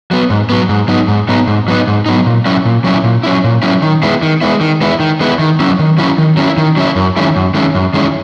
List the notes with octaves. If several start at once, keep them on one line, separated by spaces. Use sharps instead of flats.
F#3 B3
G#2
F#3 B3
G#2
F#3 B3 D#4
G#2
F#3 B3 D#4
G#2
F#3 B3 D#4
G#2
F#3 B3 D#4
A#2
F#3 C#4 E4
A#2
F#3 C#4 E4
A#2
F#3 C#4 E4
A#2
F#3 C#4 E4
D#3
G#3 B3 E4
D#3
G#3 B3 E4
D#3
G#3 B3 E4
D#3
G#3 B3 E4
D#3
F#3 C#4 E4
D#3
F#3 C#4 E4
D#3
F#3 C#4 E4
D#3
F#3 C#4 E4
F#2
D#3 G#3 C#4 E4
F#2
D#3 G#3 C#4 E4
F#2
D#3 G#3 C#4 E4